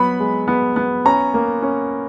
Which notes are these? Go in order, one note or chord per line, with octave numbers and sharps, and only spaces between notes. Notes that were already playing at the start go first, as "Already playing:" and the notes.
Already playing: F#3 B3 B5
G#3
B3
B3
C#4 A#5
A#3
C#4